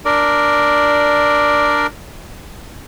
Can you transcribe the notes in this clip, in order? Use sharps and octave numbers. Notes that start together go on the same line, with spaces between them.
D4 A#4 D5